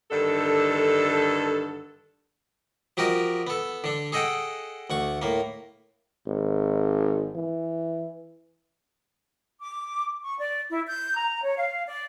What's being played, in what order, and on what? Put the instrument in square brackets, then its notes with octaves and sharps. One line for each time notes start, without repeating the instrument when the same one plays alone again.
[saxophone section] G2 D3 D#3 A4
[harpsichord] F3 F#4 G4 A#4 D#5
B3 A4
D3 D4
G#4 A4 D#5 F#5 G5
D2 F#5 C#6
A2 A#3
[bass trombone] G#1
E3
[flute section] D6
C#6
D5
E4
G6
A#5
C#5
F5
D5